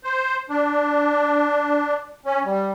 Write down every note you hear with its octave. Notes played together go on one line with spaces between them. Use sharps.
C5
D4
C#4
G3